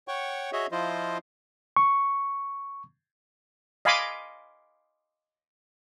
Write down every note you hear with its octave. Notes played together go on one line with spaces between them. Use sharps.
C#5 F#5 G5 C#6
F#4 G#4 C#5 D#5 E5
F3 E4 F4 C5 D#5
C#6
D#5 F5 G#5 B5 C6 D6